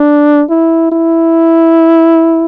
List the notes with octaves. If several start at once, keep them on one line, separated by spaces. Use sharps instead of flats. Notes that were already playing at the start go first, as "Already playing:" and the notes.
Already playing: D4
E4
E4